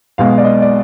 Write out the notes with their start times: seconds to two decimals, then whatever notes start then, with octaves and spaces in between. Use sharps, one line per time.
0.18 B1 B2 G#3 F5
0.38 D5
0.45 D#5
0.62 D5